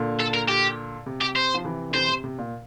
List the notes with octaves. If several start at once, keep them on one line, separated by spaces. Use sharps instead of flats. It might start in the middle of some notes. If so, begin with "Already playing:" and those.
Already playing: A#2 D3
A4
A#4
G4
C3
G4
C5
F3
C3 E3
D3
C3 E3 C5
C3
C3
A#2